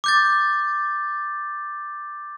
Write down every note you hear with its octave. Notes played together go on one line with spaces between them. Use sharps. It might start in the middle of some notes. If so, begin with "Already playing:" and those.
D6 G6 A6